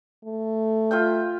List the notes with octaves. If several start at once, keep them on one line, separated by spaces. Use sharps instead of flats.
A3
F4 E5 G5